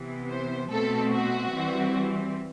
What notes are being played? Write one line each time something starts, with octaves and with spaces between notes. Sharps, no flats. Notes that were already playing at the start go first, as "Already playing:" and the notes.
Already playing: C3 E3 B3
C5
B2 A3 C4 A4
F#4
E3 G3 C4